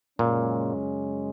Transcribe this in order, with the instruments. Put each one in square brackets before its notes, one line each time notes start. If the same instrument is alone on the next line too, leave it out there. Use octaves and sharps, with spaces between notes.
[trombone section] F#2 C#3 G#3 C#4 [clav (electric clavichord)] A#2